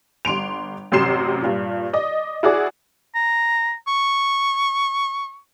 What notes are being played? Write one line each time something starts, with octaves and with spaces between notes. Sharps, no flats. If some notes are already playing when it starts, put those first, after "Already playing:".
G1 C6 D7 F7
A1 F#2 C3 C6 C7 E7
G2 A#2
D5 D#5
E4 F#4 G#4 D5
A#5
C#6